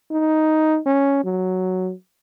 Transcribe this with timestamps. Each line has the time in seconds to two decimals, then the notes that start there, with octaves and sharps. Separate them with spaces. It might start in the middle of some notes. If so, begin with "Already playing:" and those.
0.11 D#4
0.86 C#4
1.25 F#3